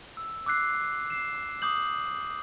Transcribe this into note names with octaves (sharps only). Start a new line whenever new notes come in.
E6
D6 E6 F#6 C7
C7 E7
D6 D#6 G6 F#7